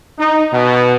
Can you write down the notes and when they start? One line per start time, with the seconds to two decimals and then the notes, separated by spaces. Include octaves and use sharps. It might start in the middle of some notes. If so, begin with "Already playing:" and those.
0.18 D#4
0.53 B2